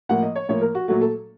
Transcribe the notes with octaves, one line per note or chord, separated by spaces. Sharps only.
A2 F3 A#3 F#5
D#5
C#5
A2 F3 A#3 C#5
A#4
F#4
A#2 F#3 A3 F#4
A4